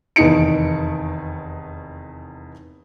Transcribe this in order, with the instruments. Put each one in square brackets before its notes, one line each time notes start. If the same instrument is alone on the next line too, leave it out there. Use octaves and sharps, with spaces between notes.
[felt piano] F1 E2 D#3 D#4 C#7 D7